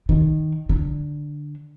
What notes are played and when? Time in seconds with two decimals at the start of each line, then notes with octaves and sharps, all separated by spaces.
0.09 D#3
0.69 D3